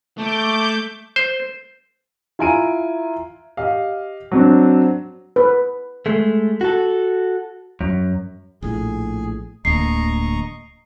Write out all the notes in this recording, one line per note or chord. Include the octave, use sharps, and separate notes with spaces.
A3 D6 G6
C5
E4 F4 G#5 A#5 D7 D#7
G4 D#5 F5
F#3 C4 D4
B4
G#3 A3
F#4 A4
F#2
A#1 A2 G#4
D1 D2 A#3 D#5 A#5 C#6 C7